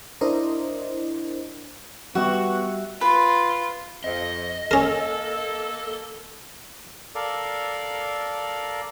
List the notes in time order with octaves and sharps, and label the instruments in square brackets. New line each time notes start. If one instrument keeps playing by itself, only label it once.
[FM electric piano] D4 E4 A#4 C5 D#5
[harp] G3 E5 E7 [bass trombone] B3 [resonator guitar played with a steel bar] F#4
[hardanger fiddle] F4 [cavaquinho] B4
[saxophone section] F2 [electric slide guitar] D#5
[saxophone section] A#3 A4 [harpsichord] C#4 A#4
[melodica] A4 A#4 D5 F5